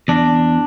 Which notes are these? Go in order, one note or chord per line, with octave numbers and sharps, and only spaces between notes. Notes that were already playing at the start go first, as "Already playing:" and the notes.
E2 D4